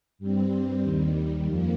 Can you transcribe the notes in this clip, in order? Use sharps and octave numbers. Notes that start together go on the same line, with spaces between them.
G2 G3 C4
D#2 D#3 G3
F2 F3 A#3